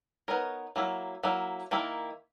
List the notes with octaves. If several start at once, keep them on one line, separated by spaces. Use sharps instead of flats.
B3 D#4 A#4 C#5
F#3 A#3 E4
F#3 A#3 E4
D#3 A#3 E4